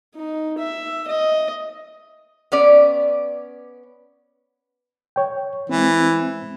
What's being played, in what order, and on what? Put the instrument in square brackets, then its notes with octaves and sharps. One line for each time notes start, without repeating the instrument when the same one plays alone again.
[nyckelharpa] D#4
E5
D#5
[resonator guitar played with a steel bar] B3 C#4 D5
[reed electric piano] C#5 G5
[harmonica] E3 [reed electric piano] G#3 C4